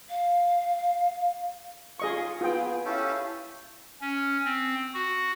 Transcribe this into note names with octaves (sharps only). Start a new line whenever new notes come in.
F5
F4 G#4 D#5 C#6
B3 F4 G#4 G5
C#4 E4 G4 A4 F5
C#4
C4
F#4